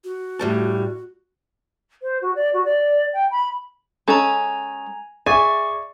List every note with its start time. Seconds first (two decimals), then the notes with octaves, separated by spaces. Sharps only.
0.04 F#4
0.39 A2 G3 A5
2.02 C5
2.21 F#4
2.35 D5
2.53 F#4
2.65 D5
3.13 G5
3.31 B5
4.08 G#3 C#4 A4 G#5 A#5
5.26 G#4 D5 E5 G#5 C#6